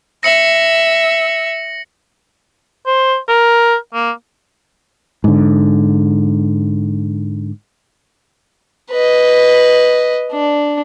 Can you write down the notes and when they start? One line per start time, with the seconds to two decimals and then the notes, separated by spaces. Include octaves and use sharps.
0.23 E5 A#6 C#7 F#7
2.87 C5
3.29 A#4
3.94 A#3
5.24 G#2 D3
8.91 B4 D#5
10.32 D4